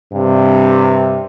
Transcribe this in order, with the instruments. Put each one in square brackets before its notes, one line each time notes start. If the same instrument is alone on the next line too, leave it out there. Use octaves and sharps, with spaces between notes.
[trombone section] G2 C3